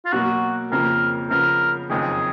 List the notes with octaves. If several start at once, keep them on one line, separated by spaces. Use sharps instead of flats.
F4
B2 F#3 A#3 F#4
F2 C#3 F3 A#3 A#4
C#3 F3 B3 A#4
F#1 F2 D#3 G#4